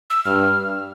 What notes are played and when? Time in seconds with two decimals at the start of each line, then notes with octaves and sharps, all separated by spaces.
0.10 E6
0.25 G2 F6